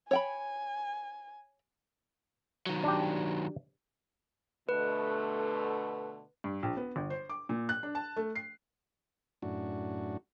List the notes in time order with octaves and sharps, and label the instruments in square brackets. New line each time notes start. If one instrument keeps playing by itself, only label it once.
[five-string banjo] C#5 G5 B5 [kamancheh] G#5
[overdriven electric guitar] D#3 F#3
[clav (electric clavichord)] D4 G4
[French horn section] B2 D3 A3 [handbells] B4
[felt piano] G2
A#1
B3
G1
C5
D6
A#2
F#6
D4
A5
A3
C7
[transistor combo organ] F#2 A2 D4 F#4